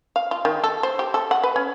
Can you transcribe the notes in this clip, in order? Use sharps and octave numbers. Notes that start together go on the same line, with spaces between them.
F5
F4
D#3
A4
C5
G4
A4
F#5
B4
C#4